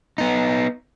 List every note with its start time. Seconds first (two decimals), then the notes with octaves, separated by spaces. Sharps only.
0.18 B3 D#4